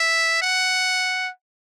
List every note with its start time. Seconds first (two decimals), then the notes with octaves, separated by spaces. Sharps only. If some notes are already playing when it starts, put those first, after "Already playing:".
Already playing: E5
0.42 F#5